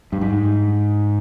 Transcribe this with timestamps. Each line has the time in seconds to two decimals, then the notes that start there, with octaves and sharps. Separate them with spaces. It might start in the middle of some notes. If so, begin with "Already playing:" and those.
0.13 G2
0.21 G#2